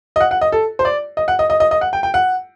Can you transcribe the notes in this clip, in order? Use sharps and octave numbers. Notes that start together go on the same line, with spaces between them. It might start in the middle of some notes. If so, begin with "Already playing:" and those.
D#5
F#5
F#5
D#5
A4
C5
D5
D#5
F#5
D#5
D#5
D#5
D#5
F#5
G5
G5
F#5